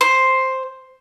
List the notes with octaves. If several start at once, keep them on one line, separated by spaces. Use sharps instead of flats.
C5